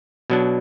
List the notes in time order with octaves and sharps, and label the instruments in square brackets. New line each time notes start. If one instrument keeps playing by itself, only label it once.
[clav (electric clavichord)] B2 F#3 D4